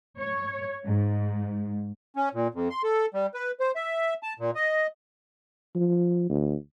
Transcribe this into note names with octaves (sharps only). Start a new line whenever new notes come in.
C#5
G#2
C#4
A#2
F2
C6
A4
G3
B4
C5
E5
A5
A#2
D#5
F3
D2